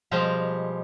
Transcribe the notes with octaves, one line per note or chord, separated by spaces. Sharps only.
B2 F3 G3 G#3 G4 F5